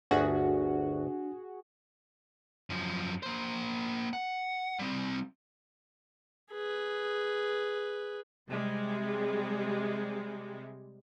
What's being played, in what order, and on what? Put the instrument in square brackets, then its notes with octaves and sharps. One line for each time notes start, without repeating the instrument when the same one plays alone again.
[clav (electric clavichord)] G1 D2 [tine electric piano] D4 [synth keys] F#4 G#4
[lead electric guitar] F#2 F3
A#3 C5
F#5
G3 C4
[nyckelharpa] G#4 B4
[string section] C3 G3 G#3